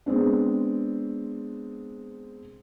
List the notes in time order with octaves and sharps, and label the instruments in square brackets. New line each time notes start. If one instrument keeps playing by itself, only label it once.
[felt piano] G#3 B3 C4 D4